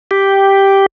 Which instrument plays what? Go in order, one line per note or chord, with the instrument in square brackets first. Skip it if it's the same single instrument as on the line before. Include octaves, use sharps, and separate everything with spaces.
[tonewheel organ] G4